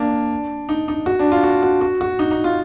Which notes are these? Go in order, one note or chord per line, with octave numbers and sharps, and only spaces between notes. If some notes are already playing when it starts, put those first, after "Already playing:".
Already playing: A#3 D4
D#4
D#4
F#4
D4
F4
F#4
F#4
F#4
F#4
D#4
D#4
F4